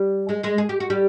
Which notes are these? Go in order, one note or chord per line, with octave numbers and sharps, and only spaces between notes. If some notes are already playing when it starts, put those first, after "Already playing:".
Already playing: G3 G4
G#3 G#4
G#3 G#4
G#4
G4
F#4
G3 G4